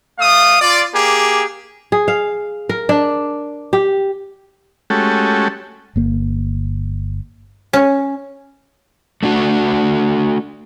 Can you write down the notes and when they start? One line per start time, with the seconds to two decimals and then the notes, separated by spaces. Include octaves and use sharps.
0.19 A3 F5 D#6
0.62 F4 D5
0.93 A#3 G4 G#4
1.92 G#4
2.08 F5
2.69 A#4
2.89 D4
3.73 G4
4.90 G#3 A3 C#4 F#4 G4 A4
5.96 G1 A#3
7.73 C#4
9.23 A3 D4 F#4